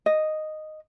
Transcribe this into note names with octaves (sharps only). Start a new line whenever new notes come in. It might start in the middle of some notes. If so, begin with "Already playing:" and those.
D#5